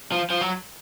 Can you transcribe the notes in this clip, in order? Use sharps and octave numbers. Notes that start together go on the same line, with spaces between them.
F3
F3
F#3